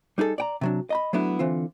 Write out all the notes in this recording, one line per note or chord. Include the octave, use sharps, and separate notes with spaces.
G3 D#4 G#4 A4
D5 G5 A#5
C3 F#3 D4
D#5 A#5 B5
F#3 A3 B3 D4 E4
D3 E3 C4 F4